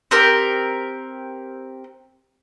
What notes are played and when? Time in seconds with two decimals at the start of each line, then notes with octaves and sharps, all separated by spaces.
0.11 C4 G4 A#4